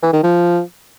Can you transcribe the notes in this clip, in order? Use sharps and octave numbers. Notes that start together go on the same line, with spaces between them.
E3
D#3
F3